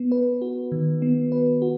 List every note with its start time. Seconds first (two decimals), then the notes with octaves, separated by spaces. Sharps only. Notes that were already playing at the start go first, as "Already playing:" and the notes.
Already playing: B3
0.12 B4
0.42 F#4
0.72 D#3
1.02 B3
1.32 B4
1.62 F#4